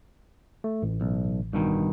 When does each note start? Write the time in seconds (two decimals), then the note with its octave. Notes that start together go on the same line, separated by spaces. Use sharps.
0.64 A3
0.82 A1
1.01 B1
1.53 G2 B2 D#3